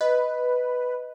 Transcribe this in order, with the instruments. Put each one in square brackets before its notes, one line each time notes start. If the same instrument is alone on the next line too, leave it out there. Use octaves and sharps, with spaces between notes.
[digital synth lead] B4 [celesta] D#5